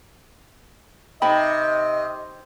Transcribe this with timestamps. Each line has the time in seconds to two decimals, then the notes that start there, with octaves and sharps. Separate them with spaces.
1.22 C3 D#4 D#5 G5 B5